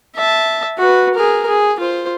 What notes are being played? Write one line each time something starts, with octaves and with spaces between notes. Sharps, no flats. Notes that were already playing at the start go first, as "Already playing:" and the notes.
E5 A5
F#4 B4
G#4 A#4
G#4
F4 C5